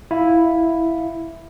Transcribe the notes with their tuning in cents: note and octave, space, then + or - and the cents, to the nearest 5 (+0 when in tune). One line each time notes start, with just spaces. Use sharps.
E4 +0 F5 +0